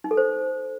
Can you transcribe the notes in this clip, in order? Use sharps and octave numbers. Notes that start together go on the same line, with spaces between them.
D#4
A4
C5